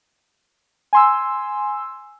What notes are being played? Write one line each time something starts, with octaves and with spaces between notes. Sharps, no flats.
G#5 C6 E6